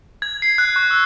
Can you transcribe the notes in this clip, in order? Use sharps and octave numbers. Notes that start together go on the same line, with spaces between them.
G#6
C7
F#6
C#6
E6